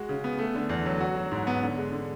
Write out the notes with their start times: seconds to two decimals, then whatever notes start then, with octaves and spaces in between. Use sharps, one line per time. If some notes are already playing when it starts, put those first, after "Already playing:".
Already playing: G#3 F#4
0.09 C#3
0.24 B3
0.38 A3
0.55 D3
0.69 E2
0.85 F#3
1.00 F#4
1.16 F#3
1.32 G#2
1.47 B3
1.62 D3
1.77 G#3
1.92 D3